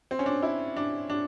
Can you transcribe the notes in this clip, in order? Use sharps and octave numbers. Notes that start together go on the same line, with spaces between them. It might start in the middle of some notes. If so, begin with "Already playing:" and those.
C4
C#4
D4
E4
D4
D4